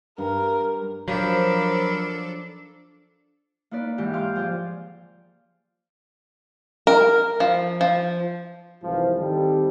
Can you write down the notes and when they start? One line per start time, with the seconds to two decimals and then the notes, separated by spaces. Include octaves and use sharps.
0.18 G2 A#4
1.08 F3 F#3 D4 A4 A#4 B5
3.71 A#3 D#4 B4 D5
3.85 E4
3.98 G#2 E3 G4
4.13 F5 C6 D6 D#6 F6 G6
4.36 F3 G#4 C5 D5
6.87 A#4
7.40 F3
7.81 F3
8.83 C2 G#2 E3 F3
9.18 D#3 G3 C4 D#4 G4 A4